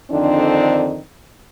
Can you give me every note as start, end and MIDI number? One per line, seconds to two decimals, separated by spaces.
0.11 0.99 41
0.11 0.99 50
0.11 0.99 51
0.11 0.99 60
0.11 0.99 62
0.11 0.99 63